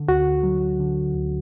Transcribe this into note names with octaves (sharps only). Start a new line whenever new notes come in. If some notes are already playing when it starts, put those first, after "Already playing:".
Already playing: D3
D2 F#4
F#3
D3
D2